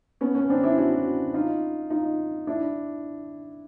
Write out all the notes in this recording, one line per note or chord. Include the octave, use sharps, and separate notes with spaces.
B3 C#4
B3 C#4
C4 D4
D4 E4
E4 F#4
D#4 F4
D#4 F4
D4 E4